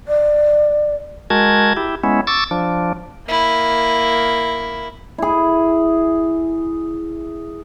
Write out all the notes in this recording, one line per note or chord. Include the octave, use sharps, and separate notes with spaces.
D5
G#3 F#4 A#4 A5 G#6
E4 G4
G#3 B3 C#4 E4
C#6 D6 E6 A6
F3 D4
A#3 E4
E4 G#4